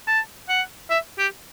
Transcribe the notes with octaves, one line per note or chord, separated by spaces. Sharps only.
A5
F#5
E5
G4